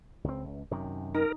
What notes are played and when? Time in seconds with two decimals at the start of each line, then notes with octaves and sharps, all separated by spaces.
0.24 C#2 C4
0.45 C#2
0.71 F#2 C3 D#3
1.15 D#4 A#4